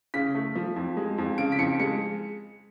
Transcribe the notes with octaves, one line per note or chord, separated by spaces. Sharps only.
C#3 B6
A3
F3
F2
G#3
F2
C#3 D7
B6
F2 C#7
G#3 C#7